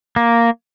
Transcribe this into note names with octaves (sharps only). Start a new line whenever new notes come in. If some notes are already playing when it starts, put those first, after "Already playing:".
A#3